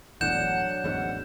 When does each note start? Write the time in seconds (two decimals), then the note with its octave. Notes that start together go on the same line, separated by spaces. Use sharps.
0.21 E1 E2 A2 F#3 D4 F#5 G6 E7
0.84 A1 E2 G#2 F#5